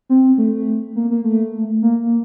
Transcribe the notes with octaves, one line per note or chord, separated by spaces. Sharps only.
C4
A3
A#3
A#3
A3
A#3